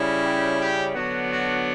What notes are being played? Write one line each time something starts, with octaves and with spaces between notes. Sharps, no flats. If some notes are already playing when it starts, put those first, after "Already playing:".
Already playing: C#3 G3 C#4 E4
G4
G4
D3 F#3 B3 D4 F#4
F#4